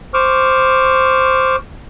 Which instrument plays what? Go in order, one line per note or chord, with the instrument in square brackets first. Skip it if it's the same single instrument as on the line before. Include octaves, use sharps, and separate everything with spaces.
[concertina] C5 C#6 D6 F6